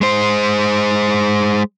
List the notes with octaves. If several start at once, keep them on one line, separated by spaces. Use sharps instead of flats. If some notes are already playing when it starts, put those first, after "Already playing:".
G#3 C5